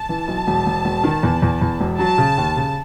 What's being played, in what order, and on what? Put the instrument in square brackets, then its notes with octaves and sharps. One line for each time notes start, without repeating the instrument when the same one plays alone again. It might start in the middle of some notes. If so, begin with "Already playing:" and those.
Already playing: [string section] A5
[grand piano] E3
B1
E1
E1
E1
D#3
E2
E2
E2
E1
[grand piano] F#3 [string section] A5
[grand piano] C#3
D#2
C#3